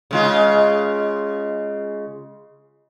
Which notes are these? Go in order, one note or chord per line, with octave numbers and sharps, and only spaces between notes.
C#3 G#3 F4